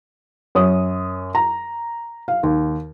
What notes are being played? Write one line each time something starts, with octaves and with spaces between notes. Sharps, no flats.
F#2 C#5 D#6
A#5
F5
D#2